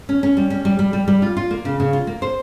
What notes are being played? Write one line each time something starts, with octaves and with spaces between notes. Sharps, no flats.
C#4
C#4
G3
C#4
G3
G3
G3
G3
F4
F4
A#3
C#3
C#3
F4
A#3
C5